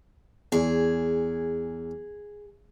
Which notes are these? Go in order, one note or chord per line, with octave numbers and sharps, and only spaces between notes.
E2 G#4